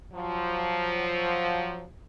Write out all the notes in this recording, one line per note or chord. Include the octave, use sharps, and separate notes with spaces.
F3 F#3